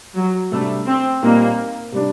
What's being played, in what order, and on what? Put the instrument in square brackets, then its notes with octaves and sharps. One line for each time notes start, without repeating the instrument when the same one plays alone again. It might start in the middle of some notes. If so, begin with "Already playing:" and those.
[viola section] F#3
[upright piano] C3 G3 D4 [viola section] A3
[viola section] C4
[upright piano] A#2 G3 C4 D#4 [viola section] A#3
[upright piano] C3 G3 D4